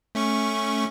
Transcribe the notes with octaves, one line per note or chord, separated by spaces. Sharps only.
A3 C#4 C#6